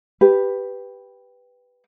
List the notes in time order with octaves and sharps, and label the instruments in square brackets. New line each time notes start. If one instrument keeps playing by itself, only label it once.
[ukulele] G4 B4